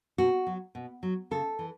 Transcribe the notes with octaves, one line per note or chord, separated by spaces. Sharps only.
B2 F#4
F#3
B2
F#3
C#3 A4
E3